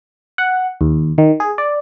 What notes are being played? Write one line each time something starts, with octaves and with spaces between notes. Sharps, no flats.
F#5
D#2
D#3
G#4
D5